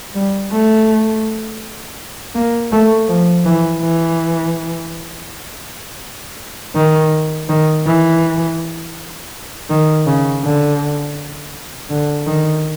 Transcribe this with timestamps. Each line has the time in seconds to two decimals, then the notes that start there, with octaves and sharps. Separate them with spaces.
0.14 G3
0.52 A3
2.35 A#3
2.72 A3
3.08 F3
3.45 E3
3.82 E3
6.75 D#3
7.49 D#3
7.86 E3
9.70 D#3
10.07 C#3
10.43 D3
11.90 D3
12.27 D#3